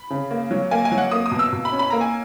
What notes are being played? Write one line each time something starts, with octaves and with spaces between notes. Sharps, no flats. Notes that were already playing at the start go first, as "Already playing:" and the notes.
Already playing: B5
C#3
A#3
F#3
A#3 G#5
G#5
F#3
F#5
A#3 D#6
D#6
B2
E6
B2
B5
C#4
B5
A#3 A#5
G#5